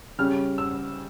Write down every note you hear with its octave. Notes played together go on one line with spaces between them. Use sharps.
C#3 G3 C#4 F6
E6